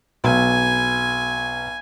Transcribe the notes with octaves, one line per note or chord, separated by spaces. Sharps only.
B1 G#5